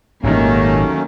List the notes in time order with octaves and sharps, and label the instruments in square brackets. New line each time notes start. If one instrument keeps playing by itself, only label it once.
[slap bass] G#1 A#2 [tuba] D#2 [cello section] D#3 A#3 [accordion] F#3 A3 C#4